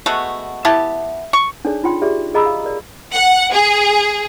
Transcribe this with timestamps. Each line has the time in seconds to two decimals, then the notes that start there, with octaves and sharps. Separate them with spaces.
0.06 G#3 A3 B3 F#4
0.65 B3 E4 G4 A5
1.33 C#6
1.65 D4 D#4 G#4 A4 C#5 D5
1.83 D#4 F4 C#5 G5 C6
2.02 F4 G4 G#4 D5 E5
2.34 G#4 D#5 A#5 B5 D#6 E6
2.46 F5
2.65 A#4 D5
3.12 F#5
3.52 G#4